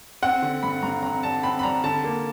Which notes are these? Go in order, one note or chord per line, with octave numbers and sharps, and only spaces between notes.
C4 F#5
D3
G2 B5
G2 A#5
C4 A#5
G3 A5
C4 B5
B5
G3 A#5
D3 A5
A#3